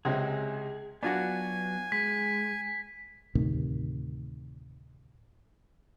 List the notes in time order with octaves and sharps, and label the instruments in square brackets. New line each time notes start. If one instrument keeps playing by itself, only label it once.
[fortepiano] C#2 C3 G#3 [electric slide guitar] G#4
[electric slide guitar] F#3 B3 [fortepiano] D4 F4 F#4 [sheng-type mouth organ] G#5
[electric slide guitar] G#3 [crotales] B6
[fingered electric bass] D2 A2 C3 D#3